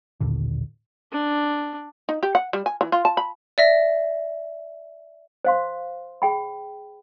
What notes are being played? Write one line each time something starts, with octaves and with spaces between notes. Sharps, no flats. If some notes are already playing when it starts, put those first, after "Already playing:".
A1 D#2 A#2 D3
D4
D#4
G4
F#5
G3
G#5
E3
F4
A5
B5
D5 E5 A#6
C5 F5 C6
G#4 G5 B5